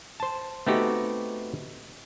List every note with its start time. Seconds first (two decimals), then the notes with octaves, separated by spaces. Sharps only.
0.20 C5 A5
0.67 A3 B3 C4 D#4 F#4 G4